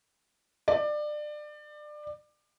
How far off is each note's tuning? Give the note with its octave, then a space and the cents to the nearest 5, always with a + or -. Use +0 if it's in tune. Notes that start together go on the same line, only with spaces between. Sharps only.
D5 +25